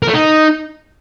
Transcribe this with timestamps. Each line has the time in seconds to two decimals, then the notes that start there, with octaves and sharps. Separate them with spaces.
0.03 A#4
0.08 A3
0.14 D#4